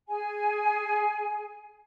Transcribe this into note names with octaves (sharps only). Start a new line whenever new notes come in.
G#4 G#5